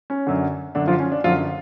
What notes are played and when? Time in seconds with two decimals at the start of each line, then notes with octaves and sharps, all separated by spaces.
0.10 C#4
0.27 F#2 D3
0.75 F#2 D3 D4
0.88 F3 F4
1.00 C#4
1.12 D4
1.24 F#2 F3 F4
1.27 D3